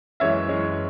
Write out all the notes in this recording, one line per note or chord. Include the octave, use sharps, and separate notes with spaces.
F#2 E3 G#3 C#4 C#5 E5
F#2 E3 G#3 C#4